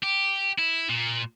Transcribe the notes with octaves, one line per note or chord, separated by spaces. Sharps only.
G4
E4
A#2